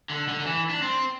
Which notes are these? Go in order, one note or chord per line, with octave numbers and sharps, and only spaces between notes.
D3
D3
D3
E3
D4
C4